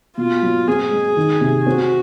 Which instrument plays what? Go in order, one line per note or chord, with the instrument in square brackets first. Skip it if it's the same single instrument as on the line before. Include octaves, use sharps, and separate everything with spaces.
[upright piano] B2 [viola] F4
[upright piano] F#3
[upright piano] C4 [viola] G#4
[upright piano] G#3
D#3
C3
[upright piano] C4 [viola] F#4